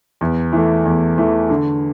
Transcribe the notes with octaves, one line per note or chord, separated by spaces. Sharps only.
E2
E3 A3
E2
E3 A3
D3